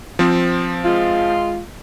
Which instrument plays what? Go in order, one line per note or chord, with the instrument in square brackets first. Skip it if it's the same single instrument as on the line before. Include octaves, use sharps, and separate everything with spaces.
[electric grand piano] F3 C4
[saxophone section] G#3 F4